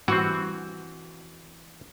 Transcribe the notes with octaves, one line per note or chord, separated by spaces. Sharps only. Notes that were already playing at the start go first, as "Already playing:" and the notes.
E3 C4 F#4